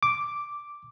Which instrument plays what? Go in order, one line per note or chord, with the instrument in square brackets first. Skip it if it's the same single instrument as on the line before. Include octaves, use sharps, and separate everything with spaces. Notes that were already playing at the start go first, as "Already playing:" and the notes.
[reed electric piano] D6